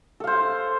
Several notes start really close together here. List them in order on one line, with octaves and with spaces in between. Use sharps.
A4 F5 C5